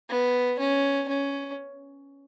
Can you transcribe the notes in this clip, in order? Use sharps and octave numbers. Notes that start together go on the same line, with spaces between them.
B3
C#4
C#4